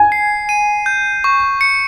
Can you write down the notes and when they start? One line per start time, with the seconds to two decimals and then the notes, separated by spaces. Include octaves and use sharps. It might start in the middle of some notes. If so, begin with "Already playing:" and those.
Already playing: G#5
0.12 C7
0.49 D#7
0.86 G6
1.24 C#6
1.61 C#7